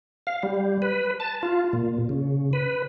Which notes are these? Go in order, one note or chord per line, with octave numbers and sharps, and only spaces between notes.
F5
G3
B4
A5
F4
A#2
C#3
B4